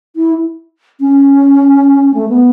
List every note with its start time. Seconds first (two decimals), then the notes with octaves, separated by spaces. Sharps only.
0.16 E4
1.00 C#4
2.14 A3
2.29 B3